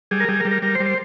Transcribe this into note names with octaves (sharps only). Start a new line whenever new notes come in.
G3 G#4
A#4
G3 G#4
A#4
G3
A#4
G3 A#4
C5
G3
C5